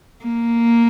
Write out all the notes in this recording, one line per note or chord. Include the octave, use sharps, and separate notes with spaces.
A#3